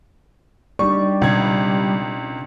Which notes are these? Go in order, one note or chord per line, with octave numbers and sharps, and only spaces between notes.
G3 D4 D#4 D5 C#6
C#2 B2 C4 G#6